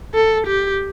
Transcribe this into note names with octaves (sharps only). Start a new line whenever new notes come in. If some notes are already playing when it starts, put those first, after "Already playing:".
A4
G4